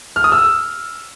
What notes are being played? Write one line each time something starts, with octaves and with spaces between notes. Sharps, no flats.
F6
D#6
E6